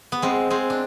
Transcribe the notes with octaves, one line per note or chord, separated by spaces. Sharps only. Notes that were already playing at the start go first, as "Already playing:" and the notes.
B3
G#3 C4
G#3 C4
D4